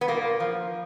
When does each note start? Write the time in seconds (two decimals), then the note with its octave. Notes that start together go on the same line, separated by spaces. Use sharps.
0.01 B3
0.08 A#2 A#3
0.40 F3